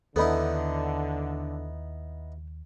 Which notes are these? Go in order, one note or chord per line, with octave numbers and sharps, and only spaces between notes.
D#2 D3 B3 D#4 E4 A4 D5 B5